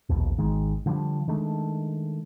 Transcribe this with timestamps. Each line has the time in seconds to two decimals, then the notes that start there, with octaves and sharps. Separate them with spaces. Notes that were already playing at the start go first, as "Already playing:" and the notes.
0.09 A#1 D#2 B2
0.38 G#1 D#3 G#3
0.86 D3 F3 G3 D4
1.28 D#3 G#3 A3 D4